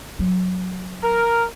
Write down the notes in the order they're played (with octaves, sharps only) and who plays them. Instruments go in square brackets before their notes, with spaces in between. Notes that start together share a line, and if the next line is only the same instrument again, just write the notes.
[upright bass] F#3
[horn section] A#4